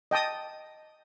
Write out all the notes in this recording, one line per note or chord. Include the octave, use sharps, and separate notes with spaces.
D#5 G5 A5 D#6